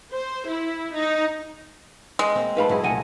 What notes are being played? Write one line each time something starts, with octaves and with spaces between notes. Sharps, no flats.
C5
E4
D#4
G#3
A#3 C4
G#2 F3 A3 B4 F5 B5
G#2 F#3 E4 G#4
C2 A#2 A3 D#5 F#5 G#5